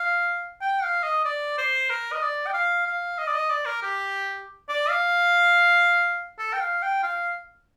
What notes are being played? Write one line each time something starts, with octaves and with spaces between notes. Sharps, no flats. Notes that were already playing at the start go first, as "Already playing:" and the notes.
Already playing: F5
G5
F5
D#5
D5
C5
A#4
D#5
D5
G5
F5
F5
D#5
D5
D#5
D5
A#4
G4
D5
F5
A4
G5
F5
G5
F5